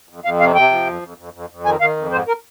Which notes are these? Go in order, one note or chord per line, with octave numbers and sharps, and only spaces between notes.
F2
F2 F5
C3 F5
C3 G5
F3
F2
F2
F2
F2
F2
D#3 G#5
D#3 F5
F2
G#2 C5
A#4